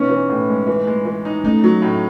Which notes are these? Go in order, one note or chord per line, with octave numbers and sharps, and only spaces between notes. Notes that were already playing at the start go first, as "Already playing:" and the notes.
Already playing: B3 C#4 D#4
E3
A2
G#3
E3
G#3
E3
D#4
A3 C#4 D#4
F#3
A2